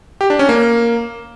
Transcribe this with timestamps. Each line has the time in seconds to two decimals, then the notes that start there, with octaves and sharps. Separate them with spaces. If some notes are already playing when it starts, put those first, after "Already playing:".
0.21 G4
0.30 D4
0.39 C#4
0.49 A#3